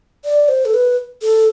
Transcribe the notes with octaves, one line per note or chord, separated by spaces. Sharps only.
D5
C5
A4
B4
A4